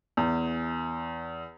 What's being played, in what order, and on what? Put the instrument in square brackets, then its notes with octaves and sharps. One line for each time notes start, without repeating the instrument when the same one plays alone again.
[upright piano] E2